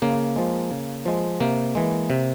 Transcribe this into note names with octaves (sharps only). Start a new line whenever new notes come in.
C#3 A#3
F3 G#3
C#3
F3 G#3
C3 A#3
E3 G#3
C3